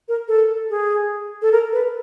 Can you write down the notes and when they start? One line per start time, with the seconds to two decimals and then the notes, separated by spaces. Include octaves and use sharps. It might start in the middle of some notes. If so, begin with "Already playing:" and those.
0.08 A#4
0.28 A4
0.70 G#4
1.42 A4
1.52 A#4
1.73 B4